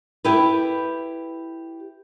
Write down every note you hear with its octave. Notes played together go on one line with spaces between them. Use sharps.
E4 G4 A4 B4